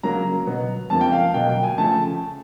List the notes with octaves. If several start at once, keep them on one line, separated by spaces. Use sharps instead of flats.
C#3 F#3 A#3 A#5
B2 F#3 B3
F2 C#3 F3 A#3 A5
G5
F5
B2 F#3 A#3 G5
G5
G#5
C#3 F3 A3 A5